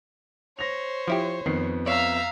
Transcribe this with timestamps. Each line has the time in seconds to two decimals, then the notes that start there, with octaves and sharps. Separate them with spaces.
0.59 C5 C#5 A#6 F7
1.08 F3 E4 G4
1.46 F2 D#3 B3 C7
1.86 C#5 D5 E5 F5 A#5